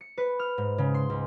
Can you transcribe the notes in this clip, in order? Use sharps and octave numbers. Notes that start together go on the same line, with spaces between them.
C#7
B4
F6
G#2
C#3
C6
C#2